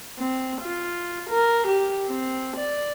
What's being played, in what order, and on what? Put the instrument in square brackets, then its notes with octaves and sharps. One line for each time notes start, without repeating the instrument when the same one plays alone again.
[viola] C4
F4
A#4
G4
C4
D5